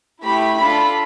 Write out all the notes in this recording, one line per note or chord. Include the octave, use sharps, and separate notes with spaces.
A3 E4 G4 B5
D4 F4 A4 B5